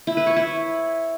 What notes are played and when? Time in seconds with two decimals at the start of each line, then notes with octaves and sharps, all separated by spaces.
0.07 E4
0.17 B4
0.27 C#5
0.36 E4